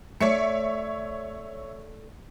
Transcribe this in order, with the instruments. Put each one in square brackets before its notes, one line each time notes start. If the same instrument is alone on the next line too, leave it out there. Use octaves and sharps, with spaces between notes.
[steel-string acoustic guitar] A3 D5 [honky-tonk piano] C#5 E5 C#7